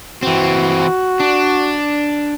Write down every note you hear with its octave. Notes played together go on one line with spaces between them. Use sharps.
E3 C4 F#4
D4